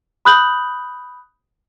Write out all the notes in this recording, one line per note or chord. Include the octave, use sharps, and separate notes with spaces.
B5 D#6 F#6 G6 F#7